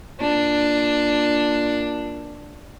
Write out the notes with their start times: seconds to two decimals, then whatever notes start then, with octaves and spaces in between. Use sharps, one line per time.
0.20 A#2 D4